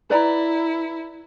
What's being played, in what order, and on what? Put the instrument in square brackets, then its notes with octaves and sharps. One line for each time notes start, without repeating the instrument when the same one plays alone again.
[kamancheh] E4 [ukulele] B4 D5 A#5